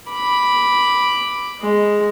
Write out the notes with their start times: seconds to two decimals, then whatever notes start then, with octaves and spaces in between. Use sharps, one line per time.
0.10 B5 D6
1.61 G#3